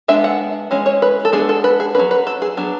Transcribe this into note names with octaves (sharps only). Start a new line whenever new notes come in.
G#3 B3 D4 E5
F#5
E3 G#3 C#4
C#5
B4
A4
G#3 B3 D4 G#4
A4
B4
G#4
F#3 C#4 B4
B4
A4
G#4
F#3 B3 D4